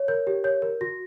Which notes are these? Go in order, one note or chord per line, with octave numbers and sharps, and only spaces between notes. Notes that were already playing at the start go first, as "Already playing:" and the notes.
Already playing: C#5
A#4 G6
G4
C#5 G6
A#4
F#4 A#6